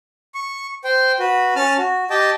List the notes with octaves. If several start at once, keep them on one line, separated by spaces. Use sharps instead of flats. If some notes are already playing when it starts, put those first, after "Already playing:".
C#6
C5 G5
F#4 B4
C#4 A5 F6
F#4
G4 D#5 G5 A5